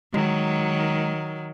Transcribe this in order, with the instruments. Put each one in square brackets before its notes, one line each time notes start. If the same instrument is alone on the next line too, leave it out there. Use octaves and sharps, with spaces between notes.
[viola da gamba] D#3 F#3 [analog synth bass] G#3